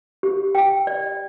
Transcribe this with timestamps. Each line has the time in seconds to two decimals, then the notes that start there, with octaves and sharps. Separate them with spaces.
0.23 G4
0.55 G5
0.87 D5